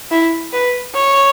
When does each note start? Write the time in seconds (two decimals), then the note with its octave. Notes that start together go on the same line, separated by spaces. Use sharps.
0.11 E4
0.53 B4
0.95 C#5